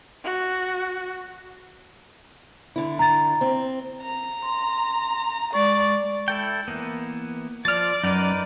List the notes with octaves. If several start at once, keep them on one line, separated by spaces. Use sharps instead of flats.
F#4
D3 E4
A#5 A6
C4
A#5
C6
G#3 D5 C#6
E4 A4 G5
E3 A#3 B3
F3 D5 F6 A6
F#2 D#4 A#4 B4